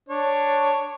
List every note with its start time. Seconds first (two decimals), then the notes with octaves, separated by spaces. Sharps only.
0.09 D4 C#5